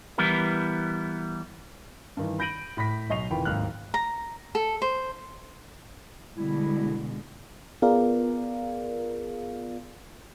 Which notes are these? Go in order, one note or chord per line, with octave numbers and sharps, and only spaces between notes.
E3 G3 B3 E4 A#4
G2 D#3 E3
B5 G6 A#6 D7 D#7 F#7
A2 B5 A#6 B6
B1 D#5 C#6 C7 F7
F1 D#3 E3 F4 G5 B5
D1 D#2 G#2 F6 F#6
A#5
A4
C5
B2 D3 G3 G#3 E4
B3 F4 G#4 A#4 D5 F5